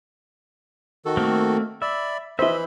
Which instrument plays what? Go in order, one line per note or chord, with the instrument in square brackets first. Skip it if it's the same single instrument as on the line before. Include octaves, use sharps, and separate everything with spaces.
[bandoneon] D#3 F#4 A4
[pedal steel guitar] A3 A#3 C4
[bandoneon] D5 B5 [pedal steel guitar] E5
[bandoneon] E3 B5 [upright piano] E4 C5 [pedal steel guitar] D#5 E5